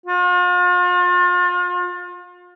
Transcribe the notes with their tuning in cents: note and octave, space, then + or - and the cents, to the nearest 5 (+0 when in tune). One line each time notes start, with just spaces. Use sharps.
F4 +40